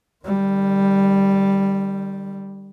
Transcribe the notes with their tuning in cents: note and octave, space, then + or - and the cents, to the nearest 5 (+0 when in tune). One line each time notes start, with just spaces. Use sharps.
D3 +45 G3 +0